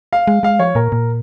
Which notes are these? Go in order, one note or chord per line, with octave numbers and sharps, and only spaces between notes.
F5
G#3
G#3 F5
F3 C#5
A#2 A#4
A#2